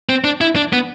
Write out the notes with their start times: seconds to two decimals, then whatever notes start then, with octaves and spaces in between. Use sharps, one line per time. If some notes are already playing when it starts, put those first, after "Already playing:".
0.09 C4
0.24 D4
0.41 E4
0.56 D4
0.73 B3